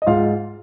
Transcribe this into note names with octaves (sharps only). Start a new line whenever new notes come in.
D#5
G#2 F4 F5